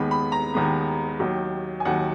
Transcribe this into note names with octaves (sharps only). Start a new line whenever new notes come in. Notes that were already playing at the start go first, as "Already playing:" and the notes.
Already playing: D#2 D#3 G#3 B3 B5
B5
A#5
D#2 D#3 G#3 B3
D#2 D#3 F#3
G#5
D#2 D#3 F#3 F#5